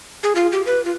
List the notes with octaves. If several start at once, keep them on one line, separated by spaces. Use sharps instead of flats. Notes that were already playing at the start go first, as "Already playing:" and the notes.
G#4
F4
G4
B4
F4